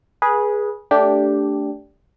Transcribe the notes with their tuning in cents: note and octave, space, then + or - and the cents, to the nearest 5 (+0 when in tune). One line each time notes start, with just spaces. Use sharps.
G#4 +0 B4 -25
A3 +0 D4 -15 G4 +0